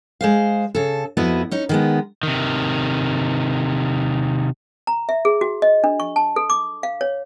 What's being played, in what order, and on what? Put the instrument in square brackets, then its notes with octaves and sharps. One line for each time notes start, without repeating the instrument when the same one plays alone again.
[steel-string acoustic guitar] G#3 C5 F5
C#3 A4
F2 B3 E4 F#4 D#5
C#4 D#4
D#3 G#3 B3
[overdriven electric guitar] C3 D#3
[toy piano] A#5
E5
G#4
F#4
D#5
D4
C#6
A5
A4
D6
F5
C#5